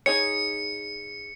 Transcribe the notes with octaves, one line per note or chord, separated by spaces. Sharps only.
D#4 G#4 C#5 C#7